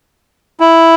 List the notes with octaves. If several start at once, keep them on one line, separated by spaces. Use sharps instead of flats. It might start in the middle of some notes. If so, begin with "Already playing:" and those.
E4